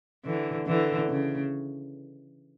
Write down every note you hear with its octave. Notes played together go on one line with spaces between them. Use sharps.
D3 E3
D3 E3
C#3